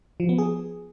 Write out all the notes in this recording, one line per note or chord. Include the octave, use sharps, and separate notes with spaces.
F3
B3
G#4